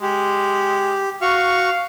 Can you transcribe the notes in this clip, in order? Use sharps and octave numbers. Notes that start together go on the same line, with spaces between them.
G#3 G4
F#4 F5 C#6